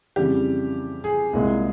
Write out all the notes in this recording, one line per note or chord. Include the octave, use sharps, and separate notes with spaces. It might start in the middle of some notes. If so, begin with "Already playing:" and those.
F2 C#3 E3 G3 G4
G#4
C2 A#2 G#3